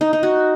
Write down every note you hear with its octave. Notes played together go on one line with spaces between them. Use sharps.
D#4
D#4
F#4